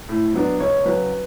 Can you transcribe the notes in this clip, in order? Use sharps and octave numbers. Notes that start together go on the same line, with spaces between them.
A2
F#3 B3 D4
C#2 C#5
C#3 F#3 B4